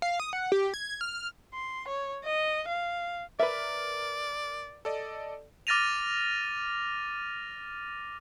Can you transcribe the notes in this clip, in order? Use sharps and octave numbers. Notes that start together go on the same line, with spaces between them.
F5
D#6
F#5
G4
G#6
F6
C6
C#5
D#5
F5
A#4 B4 D5 E5
A4 D5 D#5
D6 F6 A6 A#6 D#7 F7